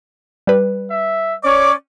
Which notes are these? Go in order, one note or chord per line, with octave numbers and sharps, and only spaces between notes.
G3 B4
E5
C#4 C#5 D5 D6